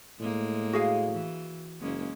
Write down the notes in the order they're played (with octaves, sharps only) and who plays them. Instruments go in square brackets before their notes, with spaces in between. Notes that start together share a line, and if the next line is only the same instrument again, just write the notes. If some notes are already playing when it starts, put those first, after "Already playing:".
[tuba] A2 [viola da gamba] G#3 A#3
[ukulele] F#4 G#4 F5
[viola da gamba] E3
[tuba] F#1 [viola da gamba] G#3 A#3 C#4